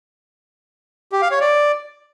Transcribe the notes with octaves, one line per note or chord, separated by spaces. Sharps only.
G4
F5
C#5
D5